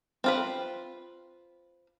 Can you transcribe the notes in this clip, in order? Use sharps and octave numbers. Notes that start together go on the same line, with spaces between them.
C4 F4 B4